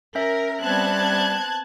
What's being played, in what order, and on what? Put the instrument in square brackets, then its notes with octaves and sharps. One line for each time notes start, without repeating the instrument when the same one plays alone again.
[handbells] C#4 E5 [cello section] A#4
[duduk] G3 [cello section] B3 C4 [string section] A5 F#6 G#6